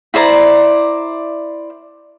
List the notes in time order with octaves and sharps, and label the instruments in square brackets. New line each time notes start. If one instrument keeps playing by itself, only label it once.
[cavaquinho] E4 C5 D5 A#5